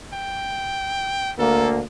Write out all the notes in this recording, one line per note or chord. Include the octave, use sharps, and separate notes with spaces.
G5
D2 A#3 A4